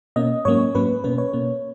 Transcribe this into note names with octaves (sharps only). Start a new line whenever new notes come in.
B2 A#3 C#4 D#5
G#2 F#3 A#3 C#4 C#5
G#2 F#3 A#3 C#4 B4
B2 A#3 C#4 B4
C#5
B2 A#3 C#4